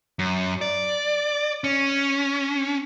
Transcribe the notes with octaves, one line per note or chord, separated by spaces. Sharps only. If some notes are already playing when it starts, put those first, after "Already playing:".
F#2
D5
C#4